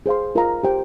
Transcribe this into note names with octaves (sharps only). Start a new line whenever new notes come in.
G#4 C5 F5 C6
F4 A#4 F5 A#5
G4 C5 G5